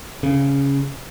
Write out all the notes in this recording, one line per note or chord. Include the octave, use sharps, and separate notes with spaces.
C#3